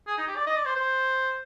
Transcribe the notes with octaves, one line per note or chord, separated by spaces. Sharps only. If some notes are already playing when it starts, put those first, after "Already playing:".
G#4
D#4
G4
D5
D#5
D5
C5
C5